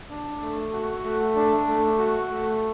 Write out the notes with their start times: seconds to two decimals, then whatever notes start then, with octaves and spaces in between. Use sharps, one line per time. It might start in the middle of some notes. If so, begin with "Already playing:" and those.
0.10 D4
0.41 A3
0.72 F#4
1.04 A3
1.36 D4
1.67 A3
1.98 F#4
2.30 A3